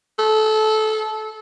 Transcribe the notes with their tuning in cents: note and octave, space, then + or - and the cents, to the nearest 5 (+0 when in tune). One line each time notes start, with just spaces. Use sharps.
A4 -20